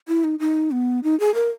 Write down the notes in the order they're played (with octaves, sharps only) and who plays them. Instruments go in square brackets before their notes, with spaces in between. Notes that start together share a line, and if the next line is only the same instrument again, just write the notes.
[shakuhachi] E4
D#4
D#4
B3
D#4
G#4
A#4